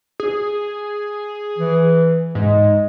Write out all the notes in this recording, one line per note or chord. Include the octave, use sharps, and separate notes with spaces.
G#4
E3
G#2 G#3